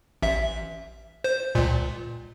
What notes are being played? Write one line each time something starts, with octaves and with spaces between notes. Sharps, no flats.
A1 E5
C5
C#2 A#2